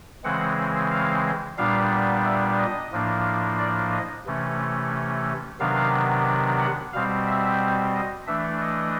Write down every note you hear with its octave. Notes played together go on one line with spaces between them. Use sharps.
C#3 E3 G#3 C4 F#5
F5
A#2 G3 B3 D4 F5
E5
D#5
A2 F3 A#3 D4
D5
D#5
C3 E3 A3 C#4
C3 D#3 F#3 B3 D4 F5
F#5
B2 G3 C4 F5
E5
D#5
E3 A3 D4 E5
D#5